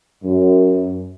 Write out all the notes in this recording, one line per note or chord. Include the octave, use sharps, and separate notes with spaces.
F#2